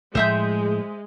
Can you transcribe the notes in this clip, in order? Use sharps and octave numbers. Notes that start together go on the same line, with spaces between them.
A2 F3 G#3 A3 C5 E5 G6